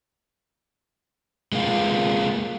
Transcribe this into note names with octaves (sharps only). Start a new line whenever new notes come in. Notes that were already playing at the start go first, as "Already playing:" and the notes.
G#3 A#3 D#4 F4